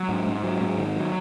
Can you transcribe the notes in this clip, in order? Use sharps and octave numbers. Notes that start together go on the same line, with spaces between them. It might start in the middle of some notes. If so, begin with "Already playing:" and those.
Already playing: F#3
G#2
G#2
F#3
G#2
D#3
F#3